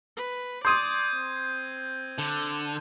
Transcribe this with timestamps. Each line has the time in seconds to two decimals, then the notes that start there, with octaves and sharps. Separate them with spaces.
0.17 B4
0.65 D5 C6 D#6 G6 G#6 D#7
1.13 C4
2.18 D3